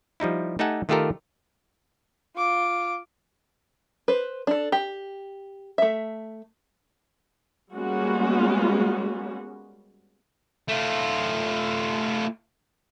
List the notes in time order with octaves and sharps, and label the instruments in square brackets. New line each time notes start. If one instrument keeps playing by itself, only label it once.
[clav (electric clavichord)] F3 G3 D#4 E4
A3 D#4 G4 A4 F#5 G#5
D#3 A3 F4 G4 A4 A#4
[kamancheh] F4 D6
[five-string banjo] B4 C5
D4 A4
G4
A3 E5
[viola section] G3 G#3 A#3 B3 C#4 F#4
[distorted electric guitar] A3 F4